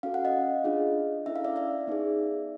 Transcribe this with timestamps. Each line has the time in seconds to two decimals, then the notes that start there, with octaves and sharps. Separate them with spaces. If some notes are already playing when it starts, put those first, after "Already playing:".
0.03 C#4 F#4 A4 F5
0.14 F#5
0.25 D#5 F5
0.64 D4 F4 G#4
1.26 C#4 E4 A4 E5
1.36 F5
1.44 D5 E5
1.56 D5 E5
1.87 B3 D#4 G#4